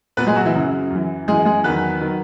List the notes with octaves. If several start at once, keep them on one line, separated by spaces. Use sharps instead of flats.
A#2 F#3 B3 B4
G#3 G#4
F#3 F#4
E3 E4
F#2 C#3 F#3
F#2
E3
F#2 E3 G#3 G#4
G#3 G#4
E2 D#3 F#3 B3 B4
D#3 F#3